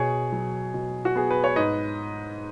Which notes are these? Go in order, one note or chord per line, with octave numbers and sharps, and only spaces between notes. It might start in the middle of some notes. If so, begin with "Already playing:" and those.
Already playing: B2 G#4 C#5
F#3
B2
F#4
B3 G#4
B4
C#5
G#2 B4 D#5